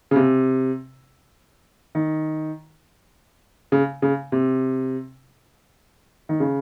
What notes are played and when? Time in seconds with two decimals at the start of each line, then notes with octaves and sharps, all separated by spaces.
0.11 C#3
0.16 C3
1.95 D#3
3.72 C#3
4.02 C#3
4.32 C3
6.29 D#3
6.40 C#3